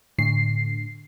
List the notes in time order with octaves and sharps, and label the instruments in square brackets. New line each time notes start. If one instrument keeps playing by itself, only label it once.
[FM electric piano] A2 D3 C7